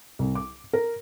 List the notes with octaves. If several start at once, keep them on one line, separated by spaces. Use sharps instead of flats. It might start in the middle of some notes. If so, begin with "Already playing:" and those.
C2
D6
A#4